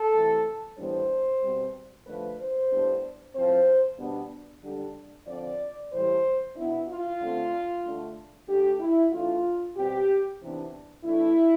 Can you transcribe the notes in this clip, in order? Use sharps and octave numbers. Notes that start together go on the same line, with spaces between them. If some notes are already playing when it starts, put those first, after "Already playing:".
Already playing: A4
C3 E3 A3
A2 E3 G3 B3 D4 C5
B2 G3 C4
D3 F3 A3 D4 B4
C5
A2 G3 B3 D4
A2 F3 C4 C5
B2 G3 B3 D4
D3 G3 D4
D3 F3 C4 D5
A2 E3 G3 C5
B2 B3 D4 E4
F4
D3 A3 C4
D3 A3 D4
D3 A3 D4 G4
E4
E3 A3 D4 F4
B2 G3 C4 G4
C3 E3 B3 D4
E3 A3 D4 E4